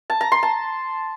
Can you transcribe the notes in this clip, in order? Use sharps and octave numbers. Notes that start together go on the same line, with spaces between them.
A5
A#5
C6
A5